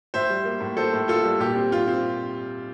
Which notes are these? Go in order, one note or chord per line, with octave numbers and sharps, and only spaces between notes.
A2 C5 E5
G3
A#3
A2
A#3 A4 C5
A2
A#3 F4 A4
G3
A#2 G4
C4
A#2 F4
C4